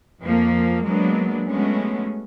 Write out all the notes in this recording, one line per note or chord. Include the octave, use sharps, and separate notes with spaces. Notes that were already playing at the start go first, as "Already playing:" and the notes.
F2 F3 A#3
F#3 G#3 A#3 B3 D4
F#3 G#3 A3 B3 C#4